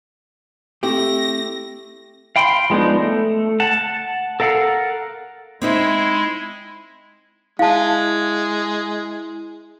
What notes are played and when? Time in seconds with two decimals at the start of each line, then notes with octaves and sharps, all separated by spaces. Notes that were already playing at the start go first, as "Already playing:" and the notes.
0.83 A3 C4 E4 G4 A#6
2.36 F5 G5 B5 C6
2.70 F3 G#3 B3 D4 D#4
2.99 A3
3.60 F#5 A5
4.40 A4 A#4 F5 F#5
5.62 G#3 C4 D#4 E4 E5
7.59 G#3 E4 F5 A5